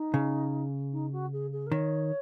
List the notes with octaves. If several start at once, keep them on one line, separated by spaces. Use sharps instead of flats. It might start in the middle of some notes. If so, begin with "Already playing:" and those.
Already playing: D#4
C#3
D#4
F#4
G#4
G#4
A#4
D#3 C#5